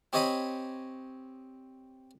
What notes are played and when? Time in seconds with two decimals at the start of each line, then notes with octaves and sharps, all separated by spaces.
0.13 C4 G4 C#5 D#5 G#5 B5